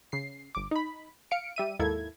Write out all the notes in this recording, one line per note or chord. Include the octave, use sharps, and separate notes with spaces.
C#3 C7
G1 D6
D#4 B5
F5 C#7 D7
G3 E5 D#7
D#2 G#2 A#3 E4 A4 G#6